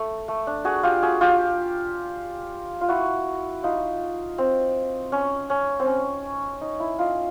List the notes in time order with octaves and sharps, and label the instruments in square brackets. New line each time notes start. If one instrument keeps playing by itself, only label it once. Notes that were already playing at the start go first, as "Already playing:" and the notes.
Already playing: [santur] A3
A3
D4
F#4 G#4
F4 G4
F#4 G#4
F4 G4
F4
E4 F#4
D#4 F4
C4
C#4
C#4
C4
C#4
D#4
E4
D#4 F4